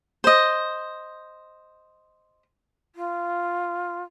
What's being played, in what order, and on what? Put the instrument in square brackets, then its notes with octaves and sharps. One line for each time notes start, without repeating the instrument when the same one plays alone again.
[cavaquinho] C5 D#5
[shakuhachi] F4